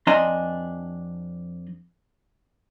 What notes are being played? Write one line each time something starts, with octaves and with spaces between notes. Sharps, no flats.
F2 D4 D#5 G#5 A#5 C6